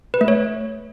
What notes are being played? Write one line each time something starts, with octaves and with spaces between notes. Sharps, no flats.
B4
A3
C#5